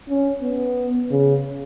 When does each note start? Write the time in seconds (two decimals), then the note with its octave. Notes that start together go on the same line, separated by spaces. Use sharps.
0.09 C#4
0.42 B3
1.10 C#3